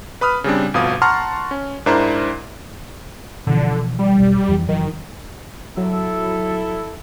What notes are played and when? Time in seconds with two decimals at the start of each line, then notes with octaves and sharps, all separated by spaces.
0.21 B4 B5 D#6 F6
0.44 C#3 G3 C4 D4
0.74 G1 F2 B2 F5 D#6
1.02 F#5 A5 A#5 C6 C#6 F6
1.51 C#4
1.86 G#2 D4 E4 A#4 C5 A#5
3.47 B2 D3 E3 F3
3.99 G3
4.18 E1 B1
4.48 F2 E3
4.69 F#1 D#3 E3 F#3
5.77 F#3 E4 A4